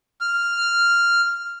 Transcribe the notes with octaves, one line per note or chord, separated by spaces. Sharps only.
F6